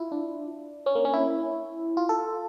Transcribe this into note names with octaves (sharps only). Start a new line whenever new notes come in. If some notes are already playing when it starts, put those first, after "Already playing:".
Already playing: E4 F4
D4
C#4
A#3
C#4
E4
F4
A4